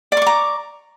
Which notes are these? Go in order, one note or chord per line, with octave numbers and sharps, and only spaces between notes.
D5 A#5 C#6 D6